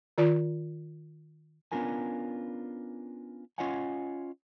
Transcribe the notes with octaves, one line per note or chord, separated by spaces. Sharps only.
D#3 F4 D5
B3 C#4 D4 F4 A#4 G#5
C#4 F4 C#5 D#5 F#5 G#5